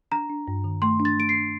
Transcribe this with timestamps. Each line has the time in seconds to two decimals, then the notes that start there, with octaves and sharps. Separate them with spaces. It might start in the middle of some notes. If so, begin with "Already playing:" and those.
0.11 D4 A#5
0.30 D4
0.48 G2
0.64 D#3
0.82 A3 C6
1.00 D4
1.05 A6
1.17 A3 D7
1.29 C7
1.35 D4